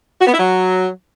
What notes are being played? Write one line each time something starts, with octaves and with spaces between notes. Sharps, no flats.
F#4
B3
E4
F#3